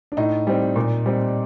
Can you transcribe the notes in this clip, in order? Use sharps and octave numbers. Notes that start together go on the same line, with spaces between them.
D4
A2 D#4
G3 C4
A#2
G3 C4